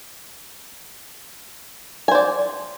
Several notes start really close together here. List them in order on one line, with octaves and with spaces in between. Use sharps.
G#5 C5 D5